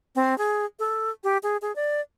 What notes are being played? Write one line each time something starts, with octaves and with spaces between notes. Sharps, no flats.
C4
G#4
A4
G4
G#4
G#4
D5